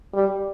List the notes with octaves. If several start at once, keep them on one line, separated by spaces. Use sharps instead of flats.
G3